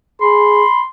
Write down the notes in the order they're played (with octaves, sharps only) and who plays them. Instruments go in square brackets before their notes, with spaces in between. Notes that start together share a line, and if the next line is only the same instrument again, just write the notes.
[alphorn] G#4 [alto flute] B5 [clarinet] C6